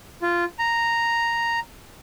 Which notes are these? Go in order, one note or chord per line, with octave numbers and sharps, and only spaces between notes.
F4
A#5